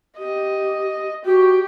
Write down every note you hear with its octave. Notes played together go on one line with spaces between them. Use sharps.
G4 D#5
F#4 G4